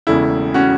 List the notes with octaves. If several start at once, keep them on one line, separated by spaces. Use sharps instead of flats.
E1 E2 C#3 A3 E4
C#4 F#4